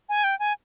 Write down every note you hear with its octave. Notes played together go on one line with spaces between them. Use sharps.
G#5
G5
G#5